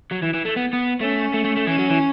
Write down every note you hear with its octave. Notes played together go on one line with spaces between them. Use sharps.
F#3
E3
E3
A3
B3
B3
A3 C#4
A3
A3
A3
E3 C#4
F#3
E3